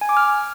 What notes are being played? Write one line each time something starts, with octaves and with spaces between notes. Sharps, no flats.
G#5
D6
F6